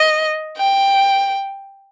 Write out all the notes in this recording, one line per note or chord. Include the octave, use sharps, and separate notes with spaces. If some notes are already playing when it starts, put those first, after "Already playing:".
Already playing: D#5
G5